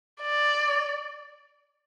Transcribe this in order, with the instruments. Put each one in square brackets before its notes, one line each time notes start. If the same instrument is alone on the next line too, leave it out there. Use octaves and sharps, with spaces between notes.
[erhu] D5